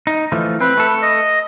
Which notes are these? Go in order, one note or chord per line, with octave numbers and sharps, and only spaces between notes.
D#4
E3 F3 A3
C4 B4
A3 A4
D#5